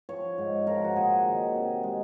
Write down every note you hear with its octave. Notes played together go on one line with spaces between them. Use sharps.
F3 C#5
G#2
F3 A#4
F#4
A#2 G#4
D#3
C3
G#3